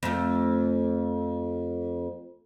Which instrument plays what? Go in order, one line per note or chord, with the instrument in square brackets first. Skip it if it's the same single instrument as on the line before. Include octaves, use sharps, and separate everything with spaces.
[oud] F2 A3